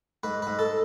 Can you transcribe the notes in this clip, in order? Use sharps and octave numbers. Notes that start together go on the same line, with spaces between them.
G#2 B4
G#2 B4
A4